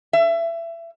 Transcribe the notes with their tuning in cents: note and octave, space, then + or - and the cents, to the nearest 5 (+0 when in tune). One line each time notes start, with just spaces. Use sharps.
E5 +25